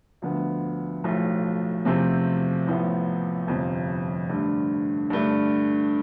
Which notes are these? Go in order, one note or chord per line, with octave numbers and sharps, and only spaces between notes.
D2 D3 F3 B3
B1 A2 F3 A3
E2 C3 F3 A3 C4
A1 A2 F3 B3
G1 F2 C3 F3 C4
G2 D3 A3
G2 D3 A3 D4